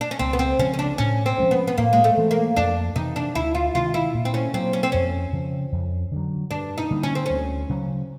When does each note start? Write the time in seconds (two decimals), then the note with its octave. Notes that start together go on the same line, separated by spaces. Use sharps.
0.01 D4
0.11 C#4
0.19 C#2 C4
0.33 B3
0.39 C4
0.59 C#3 F3 G#3 C#4
0.74 C#4
0.79 D4
0.98 A2 C#4
1.26 C4
1.38 F3 G#3 C#4
1.51 B3
1.67 B3
1.78 A2 A#3
1.93 G#3
2.04 A3
2.17 E3 G#3 C4
2.31 A#3
2.56 F2 D4
2.96 C3 E3 D#4
3.16 D4
3.35 D2 E4
3.55 F4
3.75 C3 D#3 G#3 F4
3.94 E4
4.14 A#2
4.25 C4
4.34 C#4
4.54 F#3 A#3 C4
4.73 C#4
4.83 C4
4.92 F2 C#4
5.33 C#3 F3
5.72 F2
6.11 D3 F#3
6.51 G2 D4
6.78 D#4
6.91 D3 G3 A#3
7.03 C#4
7.15 C4
7.26 D2 C#4
7.70 C#3 F#3